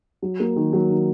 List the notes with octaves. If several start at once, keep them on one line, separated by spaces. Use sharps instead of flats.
F#3
A#3
D#3
F#3
D#3